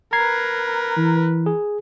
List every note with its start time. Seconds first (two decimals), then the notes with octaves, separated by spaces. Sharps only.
0.13 A#4 B4 A#5 G#6 C7
0.97 E3
1.46 G#4